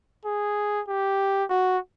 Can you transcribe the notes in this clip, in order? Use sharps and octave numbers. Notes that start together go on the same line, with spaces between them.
G#4
G4
F#4